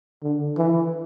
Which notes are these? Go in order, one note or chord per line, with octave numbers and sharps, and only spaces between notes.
D3
E3